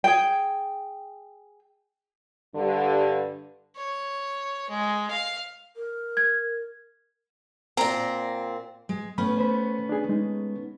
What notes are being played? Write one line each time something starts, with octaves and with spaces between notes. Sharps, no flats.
G#4 G5
G2 D3
C#5
G#3
F5
A#4
G#6
A#2 C4 A#5
G#3
A3 B3 C#4 B5
C5 B5
D4 G#4
G#3 D#4